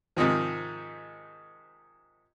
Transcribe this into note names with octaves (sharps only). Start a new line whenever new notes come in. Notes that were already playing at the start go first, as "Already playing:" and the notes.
G#2 C3 D#3 F3